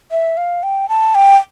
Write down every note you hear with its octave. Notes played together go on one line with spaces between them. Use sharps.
E5
F5
G5
A5
G5